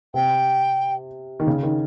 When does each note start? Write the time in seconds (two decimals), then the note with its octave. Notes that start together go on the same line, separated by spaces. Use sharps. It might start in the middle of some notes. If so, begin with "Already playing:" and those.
0.14 C3 G5
1.40 D#3
1.47 C#3
1.63 D#3